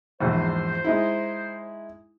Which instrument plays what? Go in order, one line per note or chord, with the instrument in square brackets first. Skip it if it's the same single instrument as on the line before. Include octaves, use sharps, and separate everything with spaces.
[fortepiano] A#1 E2 G#2 [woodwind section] C5
[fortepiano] G#3 D#4 E4